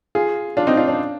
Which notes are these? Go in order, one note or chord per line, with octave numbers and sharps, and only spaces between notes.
F4 G#4
D4 F4
C4 D#4
D4 F4
D4